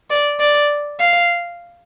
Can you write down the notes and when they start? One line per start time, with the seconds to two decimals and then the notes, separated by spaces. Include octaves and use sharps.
0.10 D5
0.40 D5
1.00 F5